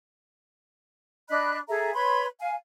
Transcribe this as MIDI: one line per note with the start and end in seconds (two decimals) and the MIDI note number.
1.29 1.58 62
1.29 1.58 75
1.29 1.58 83
1.29 1.58 90
1.68 1.94 68
1.68 1.94 69
1.68 1.94 76
1.68 1.94 82
1.94 2.25 71
1.94 2.25 73
1.94 2.25 83
1.94 2.25 84
2.39 2.55 77
2.39 2.55 80